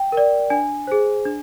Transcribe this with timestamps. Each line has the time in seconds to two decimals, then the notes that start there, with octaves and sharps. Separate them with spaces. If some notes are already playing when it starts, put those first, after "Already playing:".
Already playing: G5
0.12 A#4
0.17 D5
0.50 D4 G#5
0.87 G#4 C5
1.25 D4